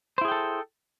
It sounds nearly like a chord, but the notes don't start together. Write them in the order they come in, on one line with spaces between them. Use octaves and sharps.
C5 E4 G#4 G5 A4